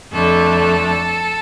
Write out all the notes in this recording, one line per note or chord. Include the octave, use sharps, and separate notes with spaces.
F2 D3 A3 A4